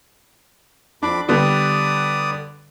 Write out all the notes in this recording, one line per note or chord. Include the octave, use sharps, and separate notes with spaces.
F2 D4 B5 D6
D3 G3 B3 D5 D#6